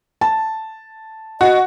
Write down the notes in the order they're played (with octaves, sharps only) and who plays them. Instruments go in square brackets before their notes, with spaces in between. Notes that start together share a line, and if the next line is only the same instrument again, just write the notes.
[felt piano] A5
[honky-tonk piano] F#4 [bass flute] D#5